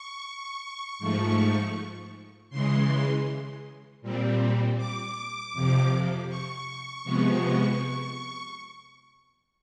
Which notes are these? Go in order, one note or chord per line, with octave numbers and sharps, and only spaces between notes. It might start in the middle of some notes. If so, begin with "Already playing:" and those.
Already playing: C#6
G#2 F3 A3
C#3 E3 G#3 C6
A#2 G3 C4
D6
F2 C3 F3
C#6
C3 F3 G#3 B3